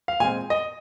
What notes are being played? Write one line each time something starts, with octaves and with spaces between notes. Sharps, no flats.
F5
A#2 G#3 C4 G#5
D#5